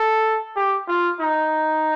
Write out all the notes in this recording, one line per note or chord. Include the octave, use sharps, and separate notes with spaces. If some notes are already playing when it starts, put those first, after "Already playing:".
Already playing: A4
G4
F4
D#4